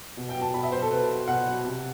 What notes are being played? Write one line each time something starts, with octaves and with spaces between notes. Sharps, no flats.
B2
G5
F#3
A5
B2 B5
E5
F#3 C5
A4
B2 B4
F#3
B2 F#5
F#3
C3